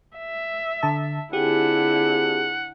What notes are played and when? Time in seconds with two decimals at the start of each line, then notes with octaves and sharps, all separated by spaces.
0.17 E5
0.83 D3 A5
1.33 D3 C4 E4 F4 G4 G#4 F#5